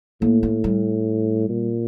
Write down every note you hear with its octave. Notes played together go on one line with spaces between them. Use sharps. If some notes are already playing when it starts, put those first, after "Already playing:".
A2 A#3
A#3
G3
A#2